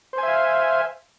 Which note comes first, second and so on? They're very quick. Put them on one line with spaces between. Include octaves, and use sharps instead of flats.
C5 G#5 E5 F5